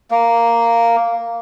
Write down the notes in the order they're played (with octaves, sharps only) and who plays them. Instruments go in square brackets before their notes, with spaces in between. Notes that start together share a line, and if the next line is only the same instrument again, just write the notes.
[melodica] A#3